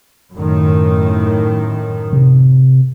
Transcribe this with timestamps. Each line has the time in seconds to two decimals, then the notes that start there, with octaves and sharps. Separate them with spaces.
0.33 F#2 A2 D#3
2.13 C3